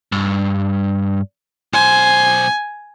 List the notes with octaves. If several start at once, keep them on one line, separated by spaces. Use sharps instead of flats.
G2
B1 C5 G#5